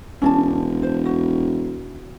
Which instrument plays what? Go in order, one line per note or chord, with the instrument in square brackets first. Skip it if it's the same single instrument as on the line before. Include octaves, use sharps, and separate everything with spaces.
[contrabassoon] E1 [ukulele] C#4 D4 A5
[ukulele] C5
F#4